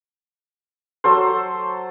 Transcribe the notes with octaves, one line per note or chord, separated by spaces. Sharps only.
F#3 A4 C5